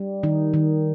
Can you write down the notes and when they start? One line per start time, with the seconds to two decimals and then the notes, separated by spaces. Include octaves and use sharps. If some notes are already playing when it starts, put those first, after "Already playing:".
Already playing: G3
0.23 D#3 D#4
0.54 D#3